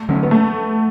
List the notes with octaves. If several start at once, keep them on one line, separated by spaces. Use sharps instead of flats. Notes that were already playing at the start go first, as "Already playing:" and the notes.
Already playing: A3
D3 F#3 C#4
B3
A3